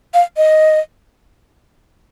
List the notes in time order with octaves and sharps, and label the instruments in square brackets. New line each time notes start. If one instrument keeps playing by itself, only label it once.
[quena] F5
D#5